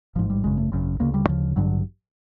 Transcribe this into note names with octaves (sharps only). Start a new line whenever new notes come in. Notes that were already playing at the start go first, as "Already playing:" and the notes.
A1 G#2 F3
G3
G#1 F#2 C#3 G#3
A3
G#1 F#2 C#3
D2 C#3 A#3
G3
D2 C#3 F3
A1 G2 D3 F#3